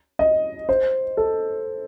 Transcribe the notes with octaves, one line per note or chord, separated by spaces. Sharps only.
D#5
C5
A4